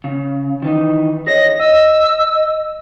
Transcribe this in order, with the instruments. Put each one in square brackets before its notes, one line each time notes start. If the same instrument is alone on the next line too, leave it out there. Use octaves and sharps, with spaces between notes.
[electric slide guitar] C#3
D#3 E3 D#4
[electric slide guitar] G#4 C#5 D#5 [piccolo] A#6
[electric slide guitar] D#5 [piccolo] E6